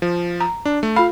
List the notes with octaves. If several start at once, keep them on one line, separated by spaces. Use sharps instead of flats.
F3
A#5
D4
A3
F4 A4 F5 B5